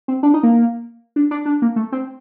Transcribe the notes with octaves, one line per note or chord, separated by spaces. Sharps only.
C4
D4
D#4
A#3
D4
D4
D4
A#3
A3
C4